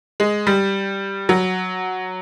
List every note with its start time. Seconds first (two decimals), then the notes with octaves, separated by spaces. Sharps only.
0.20 G#3
0.47 G3
1.29 F#3